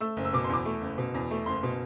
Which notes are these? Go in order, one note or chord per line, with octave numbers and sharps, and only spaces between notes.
A3 E6
F#1
E6
B2 D6
C6
E2 D6
A3
F#1
B2
E2
A3
F#1 C6
B2